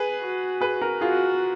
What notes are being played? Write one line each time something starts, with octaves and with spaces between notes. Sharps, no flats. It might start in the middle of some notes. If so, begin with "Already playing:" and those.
Already playing: G#4 B4
F#4
G#4 B4
F#4 A#4
F4 F#4 G#4